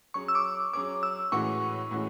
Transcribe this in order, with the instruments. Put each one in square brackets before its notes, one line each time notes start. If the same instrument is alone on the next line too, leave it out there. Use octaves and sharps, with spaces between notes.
[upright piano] F#3 C#4 G#4 C#5 [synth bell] C#6
[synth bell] E6
D6
[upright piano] F#3 C#4 G#4 C#5 [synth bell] D6
[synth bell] E6
[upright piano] A2 E3 G#3 C#4 F#4 [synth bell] C#6
[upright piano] A2 E3 G#3 C#4 F#4